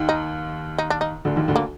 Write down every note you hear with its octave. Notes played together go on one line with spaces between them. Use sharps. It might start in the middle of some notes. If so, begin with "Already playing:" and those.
Already playing: D#2 D#3
D#4
D#4
D4
D#4
D2 D3
D#2 D#3
D2 D3
A#3